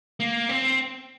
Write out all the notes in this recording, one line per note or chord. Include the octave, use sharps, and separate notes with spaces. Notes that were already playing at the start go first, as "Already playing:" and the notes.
A#3
C4